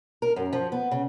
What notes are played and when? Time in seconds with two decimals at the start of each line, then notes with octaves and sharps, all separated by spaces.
0.22 A#4
0.36 F#2
0.53 F3
0.72 B3
0.91 C#3